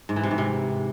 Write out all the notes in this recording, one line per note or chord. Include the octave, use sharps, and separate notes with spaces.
G#2
E3
C3
G#2
C3